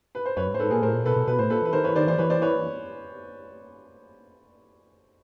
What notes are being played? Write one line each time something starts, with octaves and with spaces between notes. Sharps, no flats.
B4
C5
F#2 B4 C#5
G2
A2 C5
G#2 A4 B4
A#2 G#4 A#4
A2 A#4 C5
A#2
B2 A4 B4
B2
B2 B4
A2 C5
A#2 A4 B4
E3 B4
D#3 A#4 C5
E3 B4 C#5
D#3 C5 D5
E3 C5 D5
E3 B4 C#5
C5 D5
B4 C#5